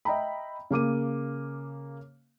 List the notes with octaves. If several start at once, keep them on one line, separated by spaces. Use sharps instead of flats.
D#5 E5 G5 A#5 B5
C#3 A#3 D6 D#7